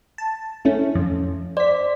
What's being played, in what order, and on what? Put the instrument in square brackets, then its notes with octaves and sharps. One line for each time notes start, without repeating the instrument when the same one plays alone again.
[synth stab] A5
A3 C#4 E4
F2
[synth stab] C5 B6 [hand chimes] D5